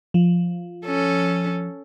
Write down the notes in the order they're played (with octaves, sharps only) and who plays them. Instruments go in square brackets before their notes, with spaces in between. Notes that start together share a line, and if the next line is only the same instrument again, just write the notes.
[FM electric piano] F3
[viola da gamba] C#4 A4